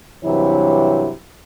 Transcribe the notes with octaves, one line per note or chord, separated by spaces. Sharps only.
G2 C3 E3 F#3 E4 C#5